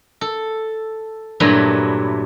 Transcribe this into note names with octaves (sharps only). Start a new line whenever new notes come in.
A4
G2 A#2 F#3 A3 E4